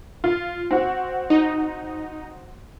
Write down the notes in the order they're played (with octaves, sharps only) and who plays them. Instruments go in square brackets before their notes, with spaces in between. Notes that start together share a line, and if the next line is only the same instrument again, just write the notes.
[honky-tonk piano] F4
C4 F#4
[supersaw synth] D#4